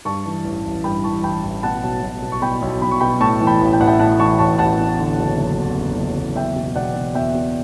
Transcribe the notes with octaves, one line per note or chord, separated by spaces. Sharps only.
G2 A5 C#6
E3
A1
A1
G2 G5 B5
E3 A5 C#6
A1 G5 B5
A1
B2 F#5 A5
B1
B1
B2
C#6
B2 G5 B5
B1
B1 B5
C#6
B2 G5 B5
A2 A5 C#6
E3
G5 B5
A1
G5
A1 F#5
E5 G5
A2 F#5 A5
E3 A5 C#6
A1 A5 C#6
A1 F#5 A5
E2
D3
F#1
F#1
E2
D3
F#1
F#1
E2 E5 G5
B2
E1 D5 F#5
E1
E2 E5 G5
B2